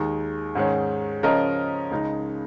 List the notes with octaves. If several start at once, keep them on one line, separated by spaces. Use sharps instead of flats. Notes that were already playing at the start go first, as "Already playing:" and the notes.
Already playing: D#2 D#3 G#3 D#4
G#2 D#3 G#3 C#4
C#3 F3 C#4 A#4 D#5
C#2 C#3 G#3 D#4